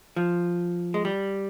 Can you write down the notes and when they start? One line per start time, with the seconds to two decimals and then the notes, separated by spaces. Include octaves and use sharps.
0.16 F3
0.94 G#3
1.05 G3